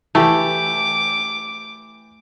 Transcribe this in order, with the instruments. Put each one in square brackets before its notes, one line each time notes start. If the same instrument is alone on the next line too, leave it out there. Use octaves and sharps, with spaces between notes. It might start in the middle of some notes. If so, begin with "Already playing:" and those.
[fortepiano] E3 G4 [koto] A3 [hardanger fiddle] D6